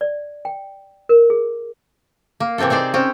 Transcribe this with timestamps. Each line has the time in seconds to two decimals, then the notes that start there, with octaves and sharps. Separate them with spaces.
0.01 D5
0.45 G5
1.09 A#4
1.30 G#4
2.40 A#3
2.58 C3 E3 C4 E4 A4
2.70 D#4 G#4 C5 D5
2.94 C4 C#4 C5